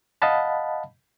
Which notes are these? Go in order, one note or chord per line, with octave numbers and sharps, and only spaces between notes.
D#5 F5 F#5 A5 B5